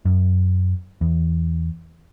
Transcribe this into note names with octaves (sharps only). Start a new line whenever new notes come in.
F#2
E2